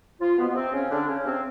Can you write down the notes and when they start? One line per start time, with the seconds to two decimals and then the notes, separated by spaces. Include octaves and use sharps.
0.20 F3 F4
0.38 B2 B3
0.48 B3
0.55 C3 C4
0.73 C#3 C#4
0.90 D3 D4
1.07 C#3 C#4
1.26 C3 C4